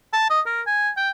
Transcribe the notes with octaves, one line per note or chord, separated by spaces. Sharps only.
A5
D#5
A#4
G#5
G5